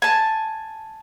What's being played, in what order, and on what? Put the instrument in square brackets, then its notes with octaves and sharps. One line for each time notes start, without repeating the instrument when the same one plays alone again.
[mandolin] G#5 A5